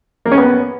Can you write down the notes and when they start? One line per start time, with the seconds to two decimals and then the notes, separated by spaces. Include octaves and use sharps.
0.25 A#3
0.31 C#4
0.38 B3